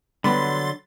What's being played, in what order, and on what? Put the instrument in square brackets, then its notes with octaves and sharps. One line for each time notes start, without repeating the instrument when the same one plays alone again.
[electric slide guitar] D3 F#3 [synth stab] G3 B3 [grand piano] B5 [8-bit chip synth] C6 A6